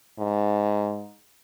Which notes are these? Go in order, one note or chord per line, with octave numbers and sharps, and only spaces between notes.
G#2